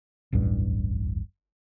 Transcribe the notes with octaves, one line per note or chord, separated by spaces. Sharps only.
D1 A1 E2 G2